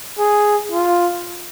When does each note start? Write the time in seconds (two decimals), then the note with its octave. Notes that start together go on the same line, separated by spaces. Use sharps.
0.18 G#4
0.72 F4